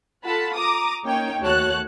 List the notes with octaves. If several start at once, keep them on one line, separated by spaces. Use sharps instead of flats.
F4 A4 F#5 A5 B5
A#5 D6 D#6
A#3 C#4 D#4 C#5 G5
D#2 A3 F#4 C#5 A5 F#6